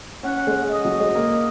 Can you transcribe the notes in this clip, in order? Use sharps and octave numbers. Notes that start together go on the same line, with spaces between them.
C#4 F#5
G#3
D#5
F#3
G#3
A#3